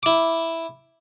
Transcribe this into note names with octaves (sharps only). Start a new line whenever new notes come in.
E4 D6